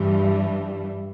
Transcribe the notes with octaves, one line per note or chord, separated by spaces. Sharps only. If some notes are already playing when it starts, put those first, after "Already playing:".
Already playing: G2 E3 G3